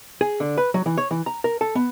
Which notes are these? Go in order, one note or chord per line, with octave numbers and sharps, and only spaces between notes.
G#4
D3
B4
F#3
E3
C#5
E3
A#5
A#4
A4
B3